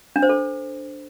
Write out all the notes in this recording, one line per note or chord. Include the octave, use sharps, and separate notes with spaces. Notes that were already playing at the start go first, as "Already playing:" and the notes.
D4
C5
A4